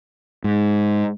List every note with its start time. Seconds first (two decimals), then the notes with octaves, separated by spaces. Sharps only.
0.44 G#2